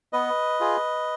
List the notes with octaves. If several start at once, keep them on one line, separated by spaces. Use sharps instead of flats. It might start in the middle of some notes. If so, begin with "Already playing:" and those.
B3 B4 D#5
F4 G#4